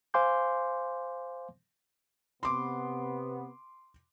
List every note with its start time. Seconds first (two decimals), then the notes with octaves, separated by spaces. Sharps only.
0.14 C5 F5 G#5 C6 D6 G6
2.43 C3 B3 C6 D6